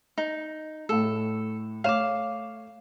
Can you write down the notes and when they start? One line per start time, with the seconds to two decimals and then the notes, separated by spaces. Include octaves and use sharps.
0.18 D#4
0.89 A2 A3 A4
1.84 A3 C#5 F5 D6 E7